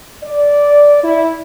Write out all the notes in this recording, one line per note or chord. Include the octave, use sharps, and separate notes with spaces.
D5
E4